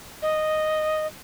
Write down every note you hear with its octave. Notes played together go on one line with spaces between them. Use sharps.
D#5